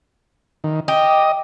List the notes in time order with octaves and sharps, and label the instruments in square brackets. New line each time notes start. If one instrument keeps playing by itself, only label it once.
[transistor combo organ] D#3
[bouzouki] G4 [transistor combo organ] D#5